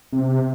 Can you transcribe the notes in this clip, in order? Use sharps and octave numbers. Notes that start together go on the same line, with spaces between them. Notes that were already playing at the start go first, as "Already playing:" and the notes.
C3